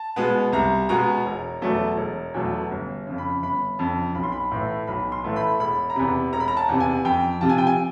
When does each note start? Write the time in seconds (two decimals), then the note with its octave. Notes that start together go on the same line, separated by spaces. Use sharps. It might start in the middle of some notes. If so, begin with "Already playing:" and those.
Already playing: A5
0.16 B2 G#3 B3
0.52 C2 A#5
0.89 B2 G#3 B3 A#5
1.26 E1
1.62 E2 B2 F#3 A3
1.97 E1
2.34 E2 B2 F#3 A3
2.71 G1
3.07 F2 C#3
3.18 B5
3.43 G1 B5
3.79 F2 C#3 A5
4.15 B1 B5
4.23 C6
4.32 B5
4.51 A2 E3 A3
4.87 B1 B5
5.12 C6
5.24 A2 E3 A3
5.36 B5
5.60 E1 B5
5.90 A#5
5.96 E2 C3 B5
6.33 E1 A#5
6.40 B5
6.48 A#5
6.57 A5
6.69 E2 C3
6.80 G#5
7.05 F2 G5
7.41 C3 F3 A5
7.49 G#5
7.58 G5
7.67 G#5